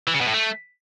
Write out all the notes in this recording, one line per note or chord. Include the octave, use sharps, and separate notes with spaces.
E3
C#3
B2
A2
A3